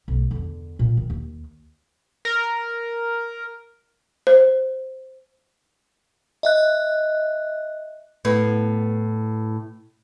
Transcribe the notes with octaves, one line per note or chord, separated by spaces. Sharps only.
B1 A3
E2 D3
A#2
D#3
D#2
A#4
C5
D#5 E5 F#6
A2 B3